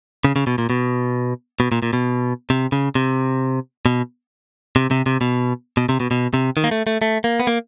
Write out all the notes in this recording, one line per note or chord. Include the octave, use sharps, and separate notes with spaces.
C#3
C#3
B2
A#2
B2
B2
A#2
A#2
B2
C3
C#3
C3
B2
C3
C3
C3
B2
B2
C3
B2
B2
C3
D#3
A#3
A3
A3
A3
A#3
B3
A#3